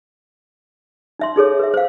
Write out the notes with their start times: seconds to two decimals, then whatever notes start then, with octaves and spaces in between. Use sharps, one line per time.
1.19 D#4 E5 C6
1.36 D#4 G#4 A4 C#5
1.59 B4 E5
1.74 C5 F5